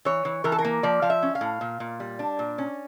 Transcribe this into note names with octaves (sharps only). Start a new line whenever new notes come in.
E3 C#5
E3
E3 A#4
A4
A#4
A#3
F3 D5
F3 F5
E5
C#4
F5
A2
A#2
A#2
G3
D4
A#2
C#4